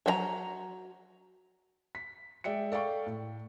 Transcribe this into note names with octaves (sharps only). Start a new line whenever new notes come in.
F#3 A4 A#5
B6
G#3 D5 E5 G5 C#7
A4 D5 F5 G5 C#6
A2